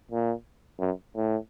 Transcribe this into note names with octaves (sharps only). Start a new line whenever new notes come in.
A#2
F#2
A2